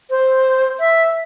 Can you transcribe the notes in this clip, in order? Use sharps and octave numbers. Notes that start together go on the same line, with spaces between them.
C5
E5